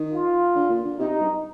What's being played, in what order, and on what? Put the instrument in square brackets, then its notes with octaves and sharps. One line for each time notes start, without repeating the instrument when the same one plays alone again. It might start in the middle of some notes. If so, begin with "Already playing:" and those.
Already playing: [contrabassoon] D#3
[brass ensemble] F4
[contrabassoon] D3
A#2
D3
[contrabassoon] C3 [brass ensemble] D#4
[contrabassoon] C3
G2